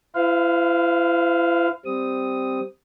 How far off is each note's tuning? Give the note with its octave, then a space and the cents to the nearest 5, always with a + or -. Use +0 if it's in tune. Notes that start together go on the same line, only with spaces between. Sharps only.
E4 +40 C5 -45 F5 +0
G3 +0 C4 -5 D#6 +0